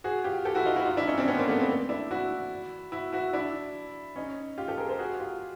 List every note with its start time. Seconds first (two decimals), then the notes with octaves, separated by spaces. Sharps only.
0.04 F#4 G#4
0.24 F4 G4
0.45 G4 A4
0.55 E4 F#4
0.65 D#4 F4
0.76 E4 F#4
0.86 D#4 F4
0.97 D4 E4
1.07 C#4 D#4
1.18 C4 D4
1.28 B3 C#4
1.38 A#3 C4
1.48 A3 B3
1.59 A#3 C4
1.89 D4 E4
2.11 E4 F#4
2.92 E4 F#4
3.13 E4 F#4
3.33 D4 E4
4.16 C#4 D#4
4.58 F4 G4
4.68 G4 A4
4.78 G#4 A#4
4.89 A#4 C5
4.99 F#4 G#4
5.19 F4 G4